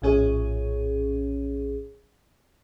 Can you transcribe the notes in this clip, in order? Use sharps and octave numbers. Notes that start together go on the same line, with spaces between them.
A#1 A2 C#4 G#4 C#5